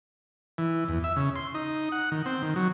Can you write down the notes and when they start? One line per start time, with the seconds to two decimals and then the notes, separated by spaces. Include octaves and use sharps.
0.58 E3
0.89 E2
1.04 E5
1.16 C#3
1.36 C6
1.55 D#4
1.92 F#5
2.12 D#3
2.26 C4
2.42 D#3
2.56 F#3